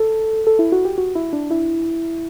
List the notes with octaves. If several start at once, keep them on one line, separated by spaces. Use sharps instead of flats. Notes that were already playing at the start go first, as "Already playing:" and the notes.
Already playing: A4
A4
E4
F#4
G4
F#4
E4
D4
E4